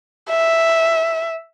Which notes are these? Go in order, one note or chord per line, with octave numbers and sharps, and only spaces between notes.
E5